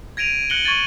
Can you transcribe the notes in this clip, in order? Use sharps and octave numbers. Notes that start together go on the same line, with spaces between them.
G#6 A#6 D7 D#7 F7
F#6 A#6 C#7 F#7 G7
C#6 G#6 A6 D#7